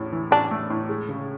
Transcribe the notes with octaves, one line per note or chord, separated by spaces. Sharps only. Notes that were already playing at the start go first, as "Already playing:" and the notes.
Already playing: A1 E2 A2
E3
A1 D4
A3
A2
G#3
C#3